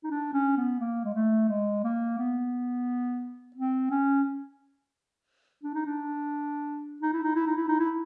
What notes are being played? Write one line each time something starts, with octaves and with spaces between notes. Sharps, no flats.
D#4
D4
C#4
B3
A#3
G#3
A3
G#3
A#3
B3
C4
C#4
D4
D#4
D4
D#4
E4
D#4
E4
D#4
E4
D#4
E4